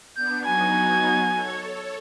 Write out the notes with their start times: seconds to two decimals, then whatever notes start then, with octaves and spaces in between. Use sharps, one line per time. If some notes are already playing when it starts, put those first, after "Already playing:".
0.16 B3 D4 G6
0.45 F#3 B3 D#4 F#4 G#5 G#6
1.32 A4 C#5